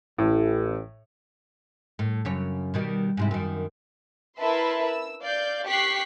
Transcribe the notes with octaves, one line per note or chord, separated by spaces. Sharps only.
A1 A2
A2
F#2 C#3 C#5
B2 D#3 G3
G#2 C3 E4
F#2 D#3
E4 A#4 B4 E5 A5 C6
E6
D5 F5 G6
G4 C#6 F#6 B6 C7